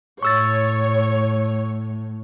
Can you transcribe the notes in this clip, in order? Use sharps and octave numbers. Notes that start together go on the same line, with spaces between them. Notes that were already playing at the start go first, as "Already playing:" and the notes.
A2 C#5 C#6 E6 A6